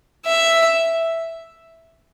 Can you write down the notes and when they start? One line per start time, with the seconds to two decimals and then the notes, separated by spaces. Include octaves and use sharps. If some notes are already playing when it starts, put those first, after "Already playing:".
0.26 E5